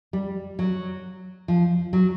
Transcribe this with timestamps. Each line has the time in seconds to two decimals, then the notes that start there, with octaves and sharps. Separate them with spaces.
0.13 G3
0.59 F#3
1.48 F3
1.93 F#3